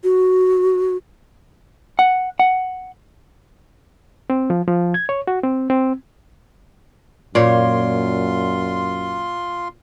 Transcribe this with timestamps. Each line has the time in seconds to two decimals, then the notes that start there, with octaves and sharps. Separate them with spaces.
0.04 F#4
1.99 F#5
2.39 F#5
4.30 C4
4.50 F3
4.68 F3
4.94 G#6
5.09 C#5
5.27 F#4
5.43 C4
5.70 C4
7.35 F#2 A#2 A#3 F4 C#5 D5 C6